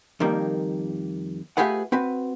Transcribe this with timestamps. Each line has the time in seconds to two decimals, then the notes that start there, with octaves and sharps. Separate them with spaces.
0.20 F2 D#3 G3 A#3
1.57 A3 F4 G4 G#4 B4 F#5
1.92 C4 F#4 B4